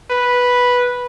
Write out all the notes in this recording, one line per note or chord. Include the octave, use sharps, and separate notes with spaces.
B4